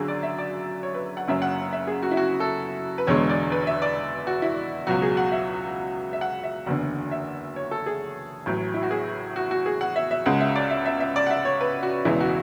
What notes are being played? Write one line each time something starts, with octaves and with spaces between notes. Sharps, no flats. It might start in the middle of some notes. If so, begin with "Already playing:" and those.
Already playing: G#1 F#2 D3 F#4 G#4
D5
E5
D5
C#5
B4
F#5
F#1 F#2 C#3 E5
F#5
E5
G#4
F#4
E4
F#4
A4
B4
E1 E2 D3 G#3 C#5
D5
B4
E5
D5
F#4
E4
C#2 B2 F#3 F#4
G#4
F#5
E5
E5
F#5
E5
F#1 E2 D3 F#5
E5
C#5
A4
G#4
A1 A2 F#3
E4
F#4
G#4
F#4
F#4
G#4
F#5
E5
E5
C#2 C#3 G#3 F#5
E5
D5
E5
E5
E5
D5
F#5
E5
C#5
B4
F#4
E1 E2 C#3 E3 G#3 E4
F#4